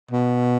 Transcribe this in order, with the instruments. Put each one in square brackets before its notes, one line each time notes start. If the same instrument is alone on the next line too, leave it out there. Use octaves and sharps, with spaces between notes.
[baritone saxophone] B2